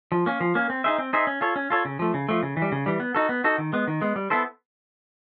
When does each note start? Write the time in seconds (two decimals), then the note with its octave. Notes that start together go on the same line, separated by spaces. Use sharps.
0.12 F3
0.26 A#3 C#4
0.41 F3
0.55 A#3 C#4
0.70 C4
0.84 D#4 G#4 C5 E5
0.98 C4
1.13 D#4 G#4 C5 E5
1.27 C#4
1.41 F4 A4 C#5
1.56 C#4
1.70 F4 A4 C#5
1.85 C#3
1.99 F3 A3
2.14 C#3
2.29 F3 A3
2.43 C#3
2.57 E3
2.62 G3
2.72 C#3
2.86 E3 G3
3.00 B3
3.15 D#4 F#4 A4
3.29 B3
3.44 D#4 F#4 A4
3.58 D#3
3.73 G#3 B3
3.88 D#3
4.01 G#3 B3
4.16 G3
4.30 B3 E4 A4 C5